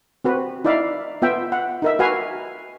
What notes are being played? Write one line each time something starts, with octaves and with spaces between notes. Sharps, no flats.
C4 F#4 B4
D#4 E4 D5 E5 F5
B3 F4 E5 G5
F#5
D#4 A#4 E5
F#4 B4 F5 G#5